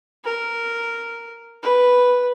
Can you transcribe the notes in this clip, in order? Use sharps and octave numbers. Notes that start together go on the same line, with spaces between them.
A#4
B4